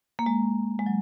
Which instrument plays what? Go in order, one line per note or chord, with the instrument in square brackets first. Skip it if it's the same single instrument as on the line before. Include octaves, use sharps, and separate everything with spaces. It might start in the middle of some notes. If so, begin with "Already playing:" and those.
[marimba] A#3
G#3
G#3
F#3